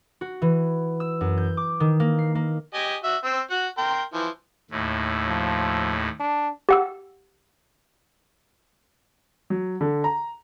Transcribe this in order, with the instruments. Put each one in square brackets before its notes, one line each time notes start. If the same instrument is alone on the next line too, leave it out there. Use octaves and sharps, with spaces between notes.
[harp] F#4
E3
E6
F#2
G6
D6
D#3
A#3
C7
A#3
[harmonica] G4 D#5 G#5
F#4 E5
C4 E6
F#4 F#5
A#4 G5 C6
E3 F3
[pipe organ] D#2 A2
[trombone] F3
D4
[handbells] G4 F#5 E6
[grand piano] F#3
D3
A#5